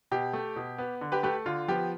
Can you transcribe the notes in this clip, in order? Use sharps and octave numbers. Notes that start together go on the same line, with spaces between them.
B2 G4
A3
B2
B3
D3
G4 B4
A3 G4 B4
D3 F4
F3 B3 G4